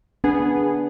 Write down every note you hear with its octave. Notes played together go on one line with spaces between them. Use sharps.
B3 D4 G#4